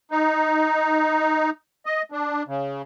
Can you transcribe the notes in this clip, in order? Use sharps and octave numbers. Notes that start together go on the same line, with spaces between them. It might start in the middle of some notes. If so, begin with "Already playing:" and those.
D#4
D#5
D4
C#3